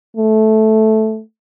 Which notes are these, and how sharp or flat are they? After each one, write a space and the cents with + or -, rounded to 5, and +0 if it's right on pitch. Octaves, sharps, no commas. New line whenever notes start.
A3 -10